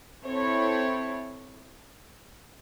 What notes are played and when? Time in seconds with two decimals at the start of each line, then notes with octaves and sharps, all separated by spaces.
0.24 C4 E4 A4 C#5